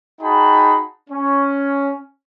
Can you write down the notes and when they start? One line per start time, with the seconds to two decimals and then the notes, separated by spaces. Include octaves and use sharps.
0.21 D#4 F#4 G#4 G5 A5 B5
1.10 C#4